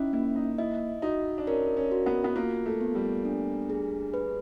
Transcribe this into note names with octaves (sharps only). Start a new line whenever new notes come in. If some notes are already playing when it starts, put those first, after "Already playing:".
Already playing: C#4 D#4 E4
A#3 E4
D#4
E4 D#5
D#4 F#4
D4
C#4 A#4
C#4
F#4
B3
B3
A#3 F4
A3
B3
G3
D4
G#4
B4